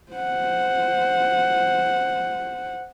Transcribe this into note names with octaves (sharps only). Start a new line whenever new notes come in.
C5 F#5